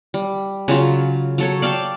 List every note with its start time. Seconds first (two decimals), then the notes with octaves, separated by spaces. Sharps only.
0.14 G3
0.68 C#3 F#3 F4
1.38 F#3 A4 C#5
1.62 D5 F5 G5 A5